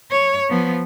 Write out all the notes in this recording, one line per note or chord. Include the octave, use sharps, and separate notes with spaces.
C#5
F3 B3